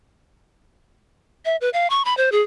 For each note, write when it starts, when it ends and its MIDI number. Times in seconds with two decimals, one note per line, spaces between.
1.45 1.56 76
1.61 1.69 71
1.73 1.87 77
1.90 2.05 85
2.05 2.16 83
2.17 2.30 72
2.32 2.42 68